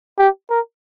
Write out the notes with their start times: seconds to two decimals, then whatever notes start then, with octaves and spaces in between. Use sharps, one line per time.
0.18 G4
0.50 A#4